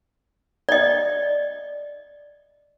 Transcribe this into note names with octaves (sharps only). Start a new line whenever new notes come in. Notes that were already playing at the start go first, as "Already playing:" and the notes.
D5 D#5